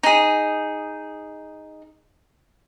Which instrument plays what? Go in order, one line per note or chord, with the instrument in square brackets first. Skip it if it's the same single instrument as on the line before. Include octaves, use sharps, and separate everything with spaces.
[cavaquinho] D#4 G#4